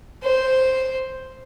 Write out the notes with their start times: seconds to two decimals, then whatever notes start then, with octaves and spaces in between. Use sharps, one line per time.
0.24 C5